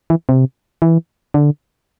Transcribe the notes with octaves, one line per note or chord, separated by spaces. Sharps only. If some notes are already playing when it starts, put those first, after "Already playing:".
E3
C3
E3
D3